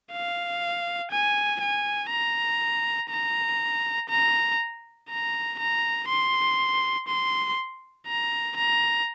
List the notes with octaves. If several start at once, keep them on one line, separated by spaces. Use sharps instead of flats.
F5
G#5
G#5
A#5
A#5
A#5
A#5
A#5
C6
C6
A#5
A#5